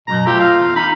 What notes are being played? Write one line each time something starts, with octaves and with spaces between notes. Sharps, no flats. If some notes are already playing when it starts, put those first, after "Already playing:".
C#2 F#2 B2 A#5
A3 C4 F4 G4
F5
E2
D#4 A#5 B5